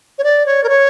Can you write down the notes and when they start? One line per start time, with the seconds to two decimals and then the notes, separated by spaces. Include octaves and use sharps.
0.18 C#5
0.24 D5
0.46 C#5
0.64 A#4
0.69 C#5